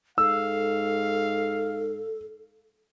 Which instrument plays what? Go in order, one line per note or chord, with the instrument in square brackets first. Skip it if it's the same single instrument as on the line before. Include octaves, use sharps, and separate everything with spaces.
[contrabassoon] G#2 [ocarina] A4 [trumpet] F5 [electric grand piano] E6